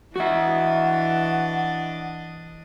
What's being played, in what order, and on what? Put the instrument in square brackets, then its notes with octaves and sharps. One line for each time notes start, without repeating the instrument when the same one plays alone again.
[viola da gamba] E3 [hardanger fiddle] D4 D#5 [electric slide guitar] F#4 E5 [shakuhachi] F#5